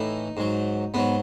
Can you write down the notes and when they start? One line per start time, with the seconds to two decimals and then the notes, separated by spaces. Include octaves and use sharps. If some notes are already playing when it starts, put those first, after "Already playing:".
Already playing: A2 E3 D#4
0.37 G#2 F#3
0.94 G#2 F#3 B3